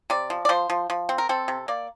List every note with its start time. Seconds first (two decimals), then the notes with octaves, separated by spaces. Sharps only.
0.10 C3 D5
0.30 F3
0.45 D5
0.49 F3 C5
0.70 F3
0.90 F3
1.09 C4
1.18 A#4
1.29 C4 A4
1.48 C3
1.68 A#3 D5